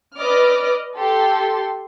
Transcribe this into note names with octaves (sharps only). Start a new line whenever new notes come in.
B4 D5 D#5 D6 F6
G4 A4 C6